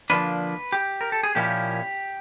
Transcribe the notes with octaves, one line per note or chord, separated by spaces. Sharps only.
D3 F3 A#3 D4 B4
G4
A#4
A4
G#4
A#2 F3 A#3 C#4 E4 G4